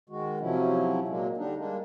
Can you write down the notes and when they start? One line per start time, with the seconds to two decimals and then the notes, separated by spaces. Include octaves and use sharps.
0.10 D#3 G#3 F#4
0.40 C3 F3 F#3 C#4 E4
1.08 A#2 F#3 G#3 A#3
1.37 D3 G3 D4 D#4
1.57 G3 G#3 A#3 D4